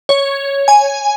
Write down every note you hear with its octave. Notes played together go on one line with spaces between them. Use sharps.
C#5
G#5